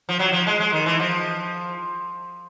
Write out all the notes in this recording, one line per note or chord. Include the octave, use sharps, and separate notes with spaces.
F3
F#3
F3
G#3
G#3
D#3
E3
F3